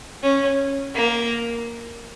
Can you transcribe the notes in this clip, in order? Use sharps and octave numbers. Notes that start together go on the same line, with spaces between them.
C#4
A#3